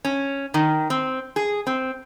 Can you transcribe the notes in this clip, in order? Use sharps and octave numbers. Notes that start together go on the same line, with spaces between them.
C#4
D#3
C4
G#4
C4